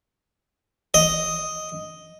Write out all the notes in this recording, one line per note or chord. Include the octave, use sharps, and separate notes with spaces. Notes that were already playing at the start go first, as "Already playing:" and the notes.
D#5